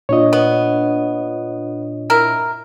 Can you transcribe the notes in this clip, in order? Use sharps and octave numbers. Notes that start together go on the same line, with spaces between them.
A#2 D4 F4 C#5 D#5
B3
E4 A#4